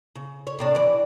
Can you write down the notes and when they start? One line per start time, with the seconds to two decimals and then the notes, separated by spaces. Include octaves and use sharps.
0.15 C#3
0.47 C#5
0.59 A2 C3 D4
0.75 E3 D5